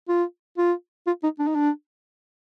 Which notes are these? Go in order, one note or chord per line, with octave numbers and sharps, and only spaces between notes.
F4
F4
F4
D#4
D4
D#4
D4